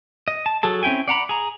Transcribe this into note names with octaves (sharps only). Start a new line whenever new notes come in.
D#5
A5
F#3 G#4 A4 A5
C4 C#4 E4 G5 G#5
D5 F#5 A#5 B5
G#4 A#5